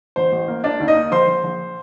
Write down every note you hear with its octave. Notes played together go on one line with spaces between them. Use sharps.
A1 C5
A1
A#3
A#3 D4 D5
D#2
D#4 D#5
A#3
A#1 C5 C6
A#1
A#1